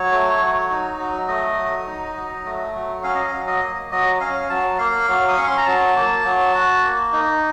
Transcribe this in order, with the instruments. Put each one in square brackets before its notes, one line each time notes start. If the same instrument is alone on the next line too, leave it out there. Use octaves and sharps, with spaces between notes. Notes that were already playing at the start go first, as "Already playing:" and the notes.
Already playing: [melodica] F#3 C#5
A3
F#3
D#4
F#3
A3 D#5
F#3
D#4
F#3
A3
F#3
C#4 F5
D#5
F5
F#3
D#5
A#3
F#3 D#5
C#4 F5
F#3 A5
A#3 F5
F#3
D#6
C#4 C#6
C6
A#5
F#3 A5
A#3
F#3
F#4
A#3
D#4